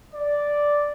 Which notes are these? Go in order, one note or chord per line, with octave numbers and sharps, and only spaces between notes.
D5